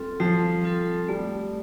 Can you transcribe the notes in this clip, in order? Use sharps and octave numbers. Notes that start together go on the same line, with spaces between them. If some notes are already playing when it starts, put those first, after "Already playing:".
Already playing: G3 C4 F4 A4
F3 G3
C4 F4 A4
G3 A3